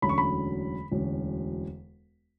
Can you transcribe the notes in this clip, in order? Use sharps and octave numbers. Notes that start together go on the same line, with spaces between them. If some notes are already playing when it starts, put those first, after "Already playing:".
E1 D2 D3 F#3 C#4 B5
C#6
B5
E1 D2 D3 F#3 C#4